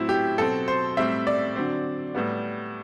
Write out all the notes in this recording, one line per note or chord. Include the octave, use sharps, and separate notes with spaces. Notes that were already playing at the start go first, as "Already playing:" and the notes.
Already playing: A2 F#3 C4 E4
G4
B2 F#3 C4 A4
C5
A2 G3 C4 E5
D5
D3 F#3 C4
A2 G3 B3